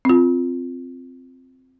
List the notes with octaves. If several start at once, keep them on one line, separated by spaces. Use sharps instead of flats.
C4 F4